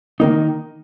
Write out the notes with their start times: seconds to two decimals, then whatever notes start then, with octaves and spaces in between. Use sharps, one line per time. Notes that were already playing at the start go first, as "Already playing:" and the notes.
0.20 D#3 A#3 D#4